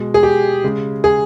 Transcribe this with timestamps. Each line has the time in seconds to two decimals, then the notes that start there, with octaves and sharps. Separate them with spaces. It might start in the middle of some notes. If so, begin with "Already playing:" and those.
Already playing: B2 G#3
0.14 G#4
0.23 G4
0.64 C#3 G#3
1.04 G#4